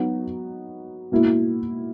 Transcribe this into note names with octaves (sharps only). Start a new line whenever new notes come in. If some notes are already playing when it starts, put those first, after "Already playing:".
Already playing: F#3 B3 D#4 F#4
B2 A#3 E4